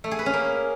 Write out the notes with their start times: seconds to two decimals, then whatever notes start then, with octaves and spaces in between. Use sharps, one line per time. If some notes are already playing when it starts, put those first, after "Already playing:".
0.04 A3
0.11 G#4
0.19 B4
0.26 C#4
0.34 A#3